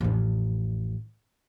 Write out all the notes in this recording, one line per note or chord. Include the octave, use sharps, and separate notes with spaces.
A1 F2